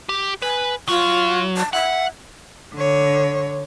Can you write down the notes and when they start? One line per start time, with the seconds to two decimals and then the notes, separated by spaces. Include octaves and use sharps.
0.09 G4
0.42 B4 G#5
0.88 F#3 F4
1.57 A5
1.73 E5 F#5
2.74 D3 C#5